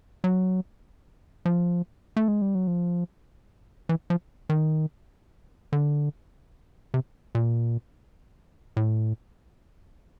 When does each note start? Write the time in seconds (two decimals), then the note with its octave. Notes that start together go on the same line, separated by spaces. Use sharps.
0.24 F#3
1.45 F3
2.16 A3
2.28 G#3
2.42 G3
2.55 F#3
2.67 F3
3.89 E3
4.10 F3
4.49 D#3
5.73 D3
6.94 C3
7.35 A#2
8.77 A2